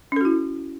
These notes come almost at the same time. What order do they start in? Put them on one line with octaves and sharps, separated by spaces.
C#4 A4 F#4 E4